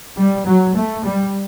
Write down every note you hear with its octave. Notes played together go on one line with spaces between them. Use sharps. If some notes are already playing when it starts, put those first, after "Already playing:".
G3
F#3
A3
G3